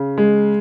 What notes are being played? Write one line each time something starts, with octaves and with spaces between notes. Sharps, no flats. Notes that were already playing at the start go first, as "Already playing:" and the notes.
Already playing: C#3
G#3